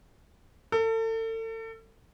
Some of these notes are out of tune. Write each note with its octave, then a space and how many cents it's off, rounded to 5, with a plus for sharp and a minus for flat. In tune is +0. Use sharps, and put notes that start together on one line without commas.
A4 +35